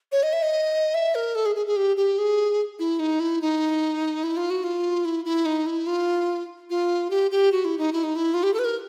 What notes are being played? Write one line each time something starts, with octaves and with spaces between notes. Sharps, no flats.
C#5
D#5
E5
D#5
E5
A#4
A4
G#4
G#4
G#4
G4
G4
G#4
E4
D#4
E4
D#4
E4
F4
F#4
F4
E4
E4
D#4
E4
F4
F4
G4
G4
F#4
E4
D#4
E4
D#4
E4
F4
G4
A4
B4
A#4